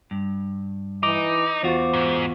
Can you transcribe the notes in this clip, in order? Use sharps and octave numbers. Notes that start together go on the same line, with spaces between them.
G2
E3 D#4 D6
E2 F4 F#4 C5
G#2